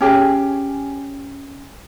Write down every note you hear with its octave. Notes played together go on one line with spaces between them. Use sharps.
C#4 G4 G#4 G#5